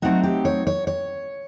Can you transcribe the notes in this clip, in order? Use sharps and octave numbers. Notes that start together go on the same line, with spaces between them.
F#3 A3 C4 D#4 F#4
G4
C#5
C#5
C#5